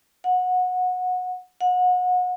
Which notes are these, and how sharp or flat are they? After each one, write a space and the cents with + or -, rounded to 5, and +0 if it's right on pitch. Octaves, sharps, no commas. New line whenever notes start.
F#5 -20
F#5 -30